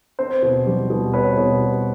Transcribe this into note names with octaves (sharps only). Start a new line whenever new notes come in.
C4 C5
B2
G3
B2
C4 B4 C#5
B2